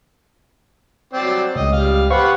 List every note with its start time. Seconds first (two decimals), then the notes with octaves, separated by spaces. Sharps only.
1.13 F#3 C4 D5
1.56 C#2 D#5
1.73 G3 F5
2.11 G4 B4 C5 F5 F#5 C#6